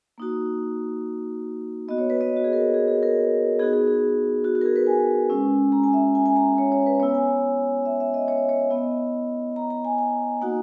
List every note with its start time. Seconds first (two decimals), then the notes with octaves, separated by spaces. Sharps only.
0.18 A#3 D#4 F#4
1.88 B3 F#4 D#5
1.98 C#5
2.10 B4
2.21 D#5
2.37 F#4
2.44 G#4
2.53 A#4
2.74 G#4
2.88 G#4
3.03 A#4
3.59 B3 D#4 F#4 G#4
3.73 G#4
3.87 G#4
4.44 F#4
4.55 F#4
4.61 A#4
4.66 G#4
4.76 B4
4.87 G#5
5.30 G#3 C#4 E4
5.72 A#5
5.83 G#5
5.93 E5
6.15 G#5
6.26 G#5
6.36 A#5
6.58 C#5
6.72 C#5
6.86 B4
7.00 B3 E4 C#5
7.15 G#5
7.85 E5
8.00 E5
8.14 D#5
8.28 C#5
8.49 C#5
8.70 B3 E4 D#5
9.56 A#5
9.70 A#5
9.85 G#5
9.98 G#5
10.41 A#3 D#4 F#4 F#5